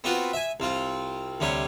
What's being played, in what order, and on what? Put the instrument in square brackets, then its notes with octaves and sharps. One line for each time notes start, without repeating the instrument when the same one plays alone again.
[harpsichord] B3 C4 F4 F#4 B4
E5 G#5
C2 C4 F4
D2 C3 G3 C#5